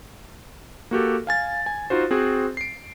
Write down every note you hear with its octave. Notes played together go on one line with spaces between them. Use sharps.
A#3 F#4 G4 A4
F5 G#5 A6
G#5
D#4 F4 F#4 C5
C4 F#4 G#4 C5
C7 D7